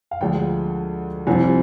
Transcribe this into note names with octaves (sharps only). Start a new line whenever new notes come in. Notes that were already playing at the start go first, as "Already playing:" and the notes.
F5
D2 D3 F3 G#3 G5
C2 C3 F3 C4 G#5